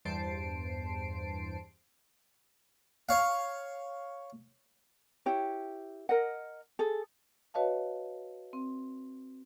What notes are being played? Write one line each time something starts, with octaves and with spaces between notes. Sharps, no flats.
E2 G2 C5 A5 C7 D7
C#5 F5
E4 G4 C#5
A#4 D#5 F#5
G#4 A4
F#4 B4 C#5 D#5 F5 A5
C4